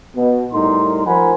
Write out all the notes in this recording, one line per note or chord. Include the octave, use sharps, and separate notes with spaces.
B2
A2 G3 D#4 A#4 C6
F3 A#4 C5 F#5 G#5 B5